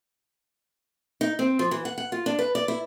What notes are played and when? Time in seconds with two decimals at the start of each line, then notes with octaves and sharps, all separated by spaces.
1.21 D#4
1.39 C4
1.59 F3
1.71 E3
1.85 F#5
1.98 F#5
2.12 F4
2.26 D4
2.39 B4
2.55 D5
2.68 E4